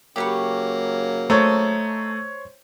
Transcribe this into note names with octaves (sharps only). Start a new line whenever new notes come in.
C#3 F#3 A#3 G4 B4 C#6
A3 D#4 A4 C5 C#5